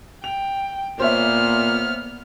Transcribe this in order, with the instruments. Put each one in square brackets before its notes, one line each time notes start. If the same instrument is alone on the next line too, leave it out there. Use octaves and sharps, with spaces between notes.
[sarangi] G5 [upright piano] F7
[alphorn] A#2 [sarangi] A#3 [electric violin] B3 F6 [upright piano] C5 C#5 E5